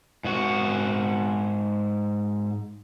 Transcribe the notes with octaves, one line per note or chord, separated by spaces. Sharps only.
G#2 F#4